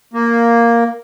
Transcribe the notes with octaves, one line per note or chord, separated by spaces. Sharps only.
A#3